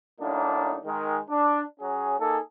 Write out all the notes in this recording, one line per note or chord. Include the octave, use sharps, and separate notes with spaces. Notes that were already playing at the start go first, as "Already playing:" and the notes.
F#2 A2 A#3 D4 D#4
D#3 G#3
D4
F#3 C#4 G#4
A#3 D#4 G#4 A4